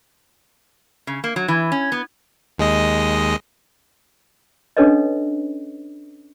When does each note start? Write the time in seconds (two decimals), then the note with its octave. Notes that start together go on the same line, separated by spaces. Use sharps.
1.07 C#3
1.24 A#3
1.36 F#3
1.48 E3
1.72 C#4
1.92 B3
2.58 D#2 G#3 D#5
4.77 C#4 D4 A4 B4 C#5 D#5